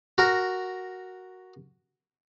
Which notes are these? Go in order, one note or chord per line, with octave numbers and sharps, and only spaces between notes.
F#4 A#4